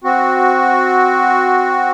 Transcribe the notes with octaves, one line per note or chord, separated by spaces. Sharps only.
C4 F#4